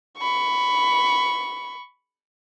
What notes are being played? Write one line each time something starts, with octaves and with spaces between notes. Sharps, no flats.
B5 C#6